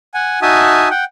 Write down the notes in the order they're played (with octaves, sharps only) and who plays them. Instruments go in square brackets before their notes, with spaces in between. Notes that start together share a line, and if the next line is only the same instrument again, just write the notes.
[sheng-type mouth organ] F#5 G#5
D#4 F#4 E5 G#5 A5 D#6
F#5 G5